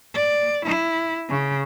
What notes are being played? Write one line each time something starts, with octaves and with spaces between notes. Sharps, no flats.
D5
E4
C#3